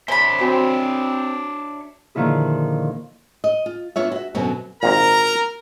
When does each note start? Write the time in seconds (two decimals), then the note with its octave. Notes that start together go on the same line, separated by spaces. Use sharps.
0.08 D4 C5 C#5 E5 G#5 B5
0.41 C4 F#4 G#5
2.15 A#2 D3 D#3 F3 E4 G#4
3.44 D#5
3.66 F4
3.96 B3 D4 F4 C#5 E5
4.12 F#4 E5
4.35 F#2 B2 D3 F#3 B3 C4
4.83 G#1 A#2 A#4 A#5